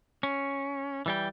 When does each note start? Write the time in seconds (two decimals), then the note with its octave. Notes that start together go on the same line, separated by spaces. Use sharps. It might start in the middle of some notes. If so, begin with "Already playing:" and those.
0.23 C#4
1.06 E3 G3 G5